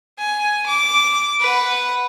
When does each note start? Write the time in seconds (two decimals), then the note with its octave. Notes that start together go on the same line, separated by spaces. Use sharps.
0.19 G#5
0.67 D6
1.41 B4 F#5